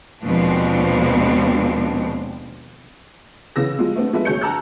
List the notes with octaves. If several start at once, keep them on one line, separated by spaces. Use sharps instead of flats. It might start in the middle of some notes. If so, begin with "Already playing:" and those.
D#2 B2 F3 G#3 C4 D4
C#3 E3 B3 E6 A#6
F3 G3 G#3 F4
A3 B3 C4 D4
F3 G#3 D4 A4 B4 E5
D2 F#3 G#4 C#5 G6 C#7
G5 A5 A#5 E6 F#6